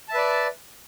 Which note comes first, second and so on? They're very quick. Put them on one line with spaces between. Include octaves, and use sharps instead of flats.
A5 E5 B4 D5